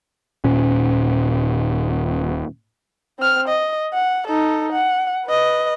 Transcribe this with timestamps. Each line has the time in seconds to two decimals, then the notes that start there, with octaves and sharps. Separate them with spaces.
0.44 D#1 A#2 C#4
3.19 C4 F6
3.48 D#5
3.94 F#5
4.27 D#4 A4
4.72 F#5
5.26 B4 D#5